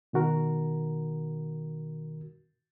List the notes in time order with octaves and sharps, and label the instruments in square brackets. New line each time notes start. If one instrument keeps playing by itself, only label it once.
[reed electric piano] B2 D#3 F#4 A#4